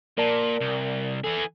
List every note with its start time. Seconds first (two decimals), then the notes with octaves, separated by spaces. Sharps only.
0.18 A#2 A#4 D5 A5
0.61 C2
1.24 E3 G#4 A4